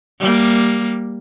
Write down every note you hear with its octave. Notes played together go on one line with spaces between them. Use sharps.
G3 A#3